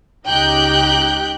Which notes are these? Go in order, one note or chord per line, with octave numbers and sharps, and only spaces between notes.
C#2 D#4 G4 G5 F#6 G6